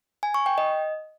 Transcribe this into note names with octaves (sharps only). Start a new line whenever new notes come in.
G#5
C#6
G5
D#5